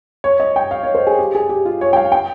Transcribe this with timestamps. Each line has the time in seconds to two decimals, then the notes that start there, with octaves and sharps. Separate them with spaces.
0.24 C#5
0.40 D#5
0.56 G5
0.71 F5
0.83 C#5
0.95 C5
1.07 G#4
1.19 G4
1.35 G#4
1.49 G4
1.65 F4
1.81 C#5
1.93 G5
1.97 F5
2.12 G5